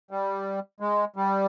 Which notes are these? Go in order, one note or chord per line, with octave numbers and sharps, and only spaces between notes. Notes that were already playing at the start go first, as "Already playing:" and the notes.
G3
G#3
G3